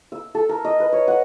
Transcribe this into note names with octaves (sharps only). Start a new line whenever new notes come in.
E6
A4
A#4
D#5
B4
C#5
F#5